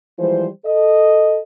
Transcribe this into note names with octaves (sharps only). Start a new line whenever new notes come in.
E3 F3 G3 G#3 C5
A4 D#5